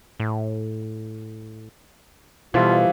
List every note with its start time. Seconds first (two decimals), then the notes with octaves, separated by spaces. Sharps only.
0.20 A2
2.54 B2 E3 F3 G3 F4 A4